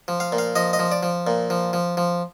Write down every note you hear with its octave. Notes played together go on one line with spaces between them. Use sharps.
F3
F5
A#2
F5
F3 D#5
D#5
F3
D5
F3
A#2
F3
F3
F3